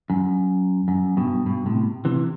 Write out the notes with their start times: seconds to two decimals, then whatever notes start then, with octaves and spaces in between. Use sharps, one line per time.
0.10 F#2
0.88 F#2
1.17 G2 B2
1.46 G2 B2
1.66 A2 C3
2.05 C3 E3